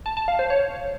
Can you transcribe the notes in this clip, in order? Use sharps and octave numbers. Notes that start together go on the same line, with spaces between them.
A5
A5
F5
C5
C#5